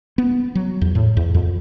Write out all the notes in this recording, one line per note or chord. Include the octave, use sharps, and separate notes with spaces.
B3
F#3
E2
A2
E2
F2